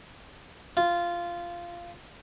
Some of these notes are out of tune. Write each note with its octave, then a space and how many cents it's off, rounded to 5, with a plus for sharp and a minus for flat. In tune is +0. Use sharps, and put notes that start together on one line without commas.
F4 -10